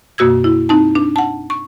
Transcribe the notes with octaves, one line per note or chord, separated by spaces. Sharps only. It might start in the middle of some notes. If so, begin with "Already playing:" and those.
F#2 B2 A#3 F#4 E6 G#6
E4
C4 D#4 A5
D4
F#5 A5
C#6